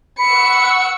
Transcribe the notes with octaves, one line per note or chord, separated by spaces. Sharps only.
F#5 B5 C#6 E6 C#7